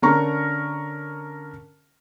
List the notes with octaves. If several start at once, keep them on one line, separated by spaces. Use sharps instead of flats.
D3 C#4 A#4 A#5 C#6